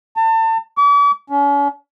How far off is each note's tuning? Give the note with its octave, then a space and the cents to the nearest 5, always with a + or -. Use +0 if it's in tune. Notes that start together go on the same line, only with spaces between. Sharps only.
A5 +35
D6 -45
C#4 +40